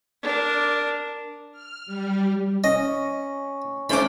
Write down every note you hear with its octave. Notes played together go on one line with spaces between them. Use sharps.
D4 A#4
F6
G3
C#4 D#5
G#3 C#4 D4 C5 B5 D6